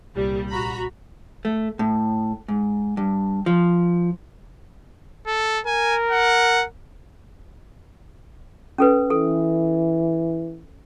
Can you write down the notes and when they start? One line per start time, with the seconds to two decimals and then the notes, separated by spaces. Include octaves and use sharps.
0.15 C2 A#2 G3
0.50 A#1 F#4 A#5 B5
1.45 A3
1.79 A2
2.48 G#2
2.97 G2
3.46 F3
5.27 A4
5.66 A#4 G#5
6.11 F#5
8.78 C#4 A4 B4
9.10 E3 A4